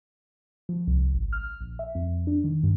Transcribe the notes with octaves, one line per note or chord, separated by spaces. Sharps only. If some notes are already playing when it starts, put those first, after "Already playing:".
F3
C2
G#1
F6
A#1
E5
F2
D4
D#3
G2